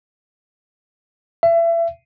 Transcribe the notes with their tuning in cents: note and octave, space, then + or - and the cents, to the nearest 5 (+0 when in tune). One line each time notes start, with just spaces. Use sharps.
E5 +30